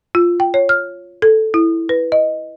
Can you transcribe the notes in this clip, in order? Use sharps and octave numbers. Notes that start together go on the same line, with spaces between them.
F4
G5
C#5
F6
A4
E4
B4
D#5